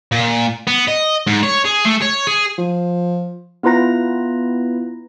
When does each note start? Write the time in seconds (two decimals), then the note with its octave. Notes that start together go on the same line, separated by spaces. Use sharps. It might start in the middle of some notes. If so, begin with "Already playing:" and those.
0.12 A#2
0.67 B3
0.88 D#5
1.27 G#2
1.43 C#5
1.65 G#4
1.85 A3
2.02 C#5
2.27 G#4
2.58 F3
3.63 B3 E4 F4 B4 A#5 A#6